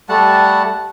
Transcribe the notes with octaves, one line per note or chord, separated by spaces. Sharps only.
G3 A3 F#5 A5